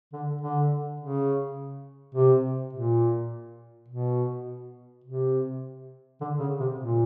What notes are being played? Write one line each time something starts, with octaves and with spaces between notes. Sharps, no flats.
D3
D3
C#3
C3
A#2
B2
C3
D3
C#3
C3
A#2